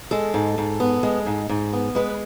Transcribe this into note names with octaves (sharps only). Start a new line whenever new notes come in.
G#3 A4
G#2
G#2
B3
G#3
G#2
G#2
B3
G#3 B4